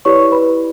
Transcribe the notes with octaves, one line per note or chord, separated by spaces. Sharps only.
E4 G4 B4 C#5 D5 C#6
B4 B5